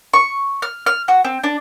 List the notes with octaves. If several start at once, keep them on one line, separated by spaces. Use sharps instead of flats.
C#6
F6
F6
F#4
C4
D4